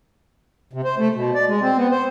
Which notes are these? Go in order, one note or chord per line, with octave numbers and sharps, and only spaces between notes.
C3
C5
A3
B2
D5
G#3
C4
B3
C5